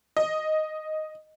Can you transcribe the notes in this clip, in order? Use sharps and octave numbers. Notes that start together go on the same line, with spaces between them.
D#5